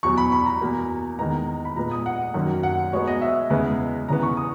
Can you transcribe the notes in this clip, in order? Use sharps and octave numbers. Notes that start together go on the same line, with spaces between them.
E2 B2 F#3 C#6
B5
B5
A#5
E2 B2 A#3
E2 D#3 G#3 B3 A#5
B5
A#2 G#3 B3 A#5
D#6
F#5
F#2 D#3 F#3 A#3
F#5
B2 G#3 B3 C#5
D#5
E5
E2 C#3 G#3 B3
E2 C#3 E3 B3 A#5
C#6
D#6